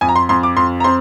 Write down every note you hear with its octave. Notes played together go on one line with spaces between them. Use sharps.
F2 G#5
A#5
C6
F2 C6
D6
F2 C6
A#5
C4 C6